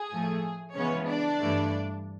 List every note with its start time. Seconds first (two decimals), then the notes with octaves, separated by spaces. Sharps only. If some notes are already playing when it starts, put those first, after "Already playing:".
Already playing: G#4
0.11 A2 F3 A3
0.74 C#3 E3 G#3 B3 C#4 C#5
1.07 D4 D5
1.39 G2 E3 A3